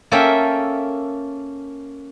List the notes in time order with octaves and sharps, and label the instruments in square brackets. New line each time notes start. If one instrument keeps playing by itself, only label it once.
[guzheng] A#3 C#4 A4 E5 G5